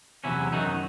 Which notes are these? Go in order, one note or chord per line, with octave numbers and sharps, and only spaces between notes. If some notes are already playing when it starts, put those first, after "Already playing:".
E2 C3 D#3 F#3 C#4 E4
F#2 D#3 F#3 D#4 F#4